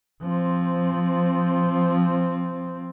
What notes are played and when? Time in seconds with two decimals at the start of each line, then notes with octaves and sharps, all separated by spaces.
0.22 F3 C4